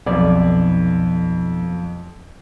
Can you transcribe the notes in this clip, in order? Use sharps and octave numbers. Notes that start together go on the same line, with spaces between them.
B1 F2 D5